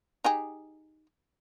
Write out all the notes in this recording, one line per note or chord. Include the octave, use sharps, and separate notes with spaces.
D#4 G4 G#4